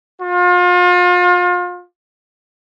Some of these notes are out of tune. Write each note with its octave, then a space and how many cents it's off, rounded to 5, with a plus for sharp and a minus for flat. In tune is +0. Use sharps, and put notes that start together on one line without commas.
F4 +35